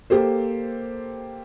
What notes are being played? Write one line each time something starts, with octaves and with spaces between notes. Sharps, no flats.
A#3 G4 A4 C5